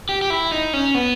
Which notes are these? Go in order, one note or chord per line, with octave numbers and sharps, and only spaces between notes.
G4
G4
E4
D#4
C#4
B3